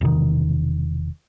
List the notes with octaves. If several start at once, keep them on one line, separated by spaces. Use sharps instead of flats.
E1 C3 D#3